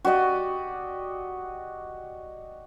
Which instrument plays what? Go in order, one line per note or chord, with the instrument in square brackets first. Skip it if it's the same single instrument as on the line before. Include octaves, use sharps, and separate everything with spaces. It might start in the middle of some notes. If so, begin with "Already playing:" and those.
[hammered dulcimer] F#4 G4 D5 D#5